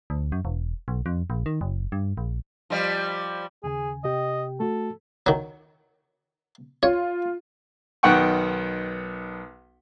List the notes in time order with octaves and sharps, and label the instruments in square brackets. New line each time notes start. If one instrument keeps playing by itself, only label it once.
[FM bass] D2
F#2
E1
B1
F2
A#1
D#3
F#1
G2
A#1
[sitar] F3 G3
[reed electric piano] D#2 C#3 G#5 [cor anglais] G#4
[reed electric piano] C3 G4 G5 [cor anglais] D#5
[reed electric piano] A3 F#4 [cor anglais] A4
[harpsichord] D#3 F#3
[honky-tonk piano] F4 [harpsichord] C#5
[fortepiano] B1 D#3 B3 F#5 G5 C#6